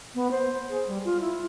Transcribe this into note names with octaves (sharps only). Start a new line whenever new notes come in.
B3
C5
G#4
G3
F4
E4